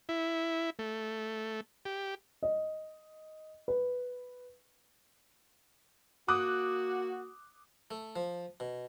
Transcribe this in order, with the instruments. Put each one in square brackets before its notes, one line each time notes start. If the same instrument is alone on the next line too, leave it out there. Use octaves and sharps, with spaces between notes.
[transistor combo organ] E4
A3
G4
[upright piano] D#5
B4
[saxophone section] A#3 F#4 [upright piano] D6 D#6 F#6
[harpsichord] A3
F3
B2